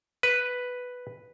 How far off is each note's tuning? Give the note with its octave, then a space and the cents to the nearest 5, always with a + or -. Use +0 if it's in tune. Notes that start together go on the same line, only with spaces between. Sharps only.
B4 +0